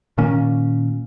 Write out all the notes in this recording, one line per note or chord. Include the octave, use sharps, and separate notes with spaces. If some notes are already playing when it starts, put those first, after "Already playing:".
A#2 D#3 A#3 C#4